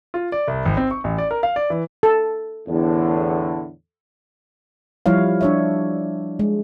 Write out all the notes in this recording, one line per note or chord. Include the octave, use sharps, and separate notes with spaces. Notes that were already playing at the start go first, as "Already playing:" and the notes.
F4
D5
C2
G#1
C4
C#6
A1
D5
A#4
F5
D5
E3
A4
E2 A2 D3
F3 G3 E4 C#5 F5
D4 C#5 E5
G#3